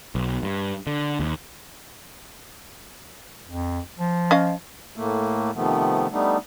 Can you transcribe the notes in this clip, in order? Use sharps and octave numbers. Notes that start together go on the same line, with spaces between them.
B1
G2
D3
D#2
F2
F3
C#4 D#5 F5
A2 A3 A#3
C3 D#3 F3 A3 B3
G3 A3 B3 D4 D#4